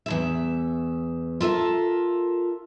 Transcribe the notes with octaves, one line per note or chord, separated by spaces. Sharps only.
E2 B2 E5
F4 A4 A#4 E5